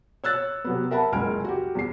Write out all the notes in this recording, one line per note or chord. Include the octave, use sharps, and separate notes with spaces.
C#5 E6 F#6 A6
C3 F#3 B3
A#4 E5 F#5 A5 B5
F#1 C#2 G#5 F6 D7
F#4 G4
E2 C7